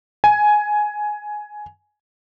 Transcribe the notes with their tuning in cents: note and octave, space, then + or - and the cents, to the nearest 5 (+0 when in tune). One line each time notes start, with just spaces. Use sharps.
G#5 +10